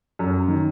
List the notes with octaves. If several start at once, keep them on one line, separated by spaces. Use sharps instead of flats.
F#2
D#3